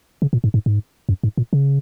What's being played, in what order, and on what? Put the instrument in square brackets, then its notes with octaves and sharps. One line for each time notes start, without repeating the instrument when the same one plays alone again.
[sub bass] C#3
A#2
G#2
G#2
G#2
F#2
G#2
A#2
C#3